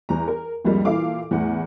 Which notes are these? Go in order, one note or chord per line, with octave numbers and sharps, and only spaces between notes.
E2 A#5
A#4
C2 F2 G#2 G3 G#3 A#3
A#2 E3 E4 A4 F5 D6
E2 A2 F#5